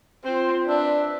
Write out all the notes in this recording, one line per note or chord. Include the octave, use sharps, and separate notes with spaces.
C4 F4 C5 C6
D4 B4 D5 E5 E6